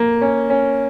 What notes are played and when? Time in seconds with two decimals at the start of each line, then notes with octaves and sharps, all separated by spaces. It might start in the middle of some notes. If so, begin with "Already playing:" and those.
Already playing: A#3
0.21 C#4
0.50 C#4